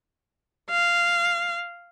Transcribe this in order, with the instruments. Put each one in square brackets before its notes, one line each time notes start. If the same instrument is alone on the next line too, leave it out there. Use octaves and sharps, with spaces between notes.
[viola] F5